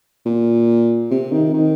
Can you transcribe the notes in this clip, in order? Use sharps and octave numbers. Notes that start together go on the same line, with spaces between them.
A#2
C3
D#3
D#3